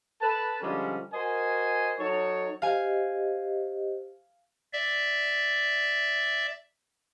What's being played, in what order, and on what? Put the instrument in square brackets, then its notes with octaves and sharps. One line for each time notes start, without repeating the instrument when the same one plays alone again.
[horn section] A4 B4 A5
D3 F3 G3 G#3 C#4
F#4 A#4 C5 D#5 G#5
F#3 D#4 A4 C#5
[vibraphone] G4 C5 D#5 [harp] F5 G#5
[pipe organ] D5 E5